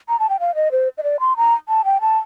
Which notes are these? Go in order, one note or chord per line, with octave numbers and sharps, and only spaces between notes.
A#5
A5
G5
F5
D#5
C5
D#5
D5
C6
A#5
A5
G5
A5